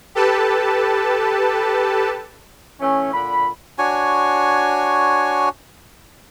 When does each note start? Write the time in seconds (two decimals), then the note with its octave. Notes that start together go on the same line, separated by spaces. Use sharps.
0.15 G4 A4 B4 A5
2.80 E3 A3 C#4
3.13 A#2 D3 B5
3.78 D4 F#4 C#5 G#5